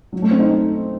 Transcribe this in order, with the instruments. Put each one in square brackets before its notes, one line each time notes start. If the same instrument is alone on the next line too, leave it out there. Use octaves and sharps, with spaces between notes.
[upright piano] F#3
A3
C4
D#4